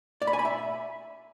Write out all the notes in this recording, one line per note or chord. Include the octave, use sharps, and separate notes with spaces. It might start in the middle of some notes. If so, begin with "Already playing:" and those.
D5
B5
G#5
B5
E5